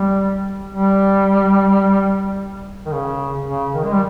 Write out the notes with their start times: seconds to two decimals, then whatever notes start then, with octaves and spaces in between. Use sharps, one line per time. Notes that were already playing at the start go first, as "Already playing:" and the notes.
Already playing: G3
0.75 G3
2.86 D#3
2.92 C#3
3.47 C#3
3.74 D#3
3.85 G#3
3.92 G3